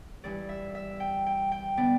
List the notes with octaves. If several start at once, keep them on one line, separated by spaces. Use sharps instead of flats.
G2 E3 G3 D5
E5
E5
G5
G5
G5
D3 B3 D4 D5